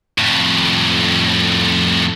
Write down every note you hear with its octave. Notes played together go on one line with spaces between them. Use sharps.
F2 A2